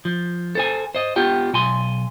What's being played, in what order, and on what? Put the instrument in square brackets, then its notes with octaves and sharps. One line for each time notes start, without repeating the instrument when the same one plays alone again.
[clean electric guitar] F3
A4 C5 G#5
C5 D#5
B3 F4 G4 G5
B1 G#5 C6